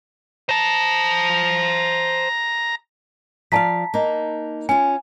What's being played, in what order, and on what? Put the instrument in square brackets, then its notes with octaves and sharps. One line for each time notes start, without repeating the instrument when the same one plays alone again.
[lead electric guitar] C5 A5 [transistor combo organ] A#5
[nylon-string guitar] F3 D5 F5 [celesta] A5 A#5 B6
[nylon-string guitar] A#3 D#4
[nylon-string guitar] C#4 F4 [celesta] G#5